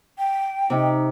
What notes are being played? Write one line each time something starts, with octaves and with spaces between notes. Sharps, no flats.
G5
C3 D#4